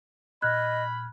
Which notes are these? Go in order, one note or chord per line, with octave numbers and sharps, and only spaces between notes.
A#2 D#5 B5 F6 F#6 G#6